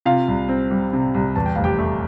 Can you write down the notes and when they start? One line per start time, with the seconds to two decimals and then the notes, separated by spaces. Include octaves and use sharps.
0.06 C3 F4 F5
0.28 C2
0.49 C4
0.71 G3
0.93 C3
1.14 C2
1.36 E2 A5
1.46 G5
1.55 F1 F5
1.64 G4 G5
1.79 A3